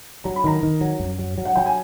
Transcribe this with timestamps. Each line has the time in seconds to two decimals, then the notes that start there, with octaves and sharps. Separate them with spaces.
0.24 F#3 A#5
0.36 B5
0.44 D#3 A#5
0.63 D#3
0.81 F#3
1.00 F#2
1.19 F#3
1.38 F#3
1.45 F#5
1.56 F#3 G5
1.66 G#5